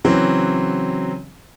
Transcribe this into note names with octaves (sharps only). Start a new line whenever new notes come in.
C#3 E3 F#3 C4